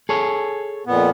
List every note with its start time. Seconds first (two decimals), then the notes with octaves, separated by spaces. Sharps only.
0.09 G#4 A4 C#5
0.87 F2 A#2 B3